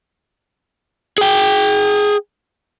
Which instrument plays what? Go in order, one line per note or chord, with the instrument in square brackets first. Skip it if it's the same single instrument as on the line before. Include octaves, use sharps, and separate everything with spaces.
[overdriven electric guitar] G#4 G5